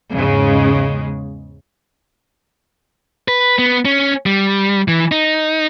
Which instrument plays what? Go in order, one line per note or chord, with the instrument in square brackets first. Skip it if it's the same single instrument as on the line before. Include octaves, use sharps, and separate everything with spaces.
[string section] E2 G#2 C#3 G#3
[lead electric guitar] B4
B3
C#4
G3
E3
D#4